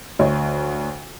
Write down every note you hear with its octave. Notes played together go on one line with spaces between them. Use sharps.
D2 C#5